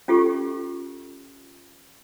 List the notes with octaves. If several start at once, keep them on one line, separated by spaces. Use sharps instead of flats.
C#4 F4 G4 A4 C#6